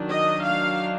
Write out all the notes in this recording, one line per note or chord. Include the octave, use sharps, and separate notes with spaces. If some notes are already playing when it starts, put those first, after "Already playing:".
Already playing: D#3 F#3 D4
D#5
F5